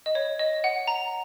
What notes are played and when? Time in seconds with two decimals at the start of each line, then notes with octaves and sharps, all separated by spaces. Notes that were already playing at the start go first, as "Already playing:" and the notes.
0.06 D#5
0.15 C#5
0.39 D#5
0.64 F#5
0.87 A#5